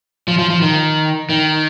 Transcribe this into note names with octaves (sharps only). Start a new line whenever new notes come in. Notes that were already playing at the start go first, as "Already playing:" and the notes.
F3
F3
F3
D#3
D#3